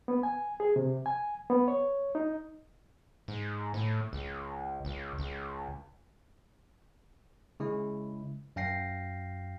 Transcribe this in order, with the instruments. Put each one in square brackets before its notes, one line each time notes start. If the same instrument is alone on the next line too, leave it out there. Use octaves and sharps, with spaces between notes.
[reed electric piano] B3
G#5
G#4
C3
G#5
B3
C#5
D#4
[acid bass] G#2
A2
C#2
C#2
C#2
[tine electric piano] C#3 G#3 E4
F#2 F5 G5 A#6 C7